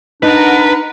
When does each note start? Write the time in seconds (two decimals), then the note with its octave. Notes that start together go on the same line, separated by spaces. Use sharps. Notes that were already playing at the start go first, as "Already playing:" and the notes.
0.23 D4 D#4 A#4 B4 F#5